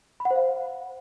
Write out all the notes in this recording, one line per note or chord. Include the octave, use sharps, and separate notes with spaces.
B5
F#5
C5
F5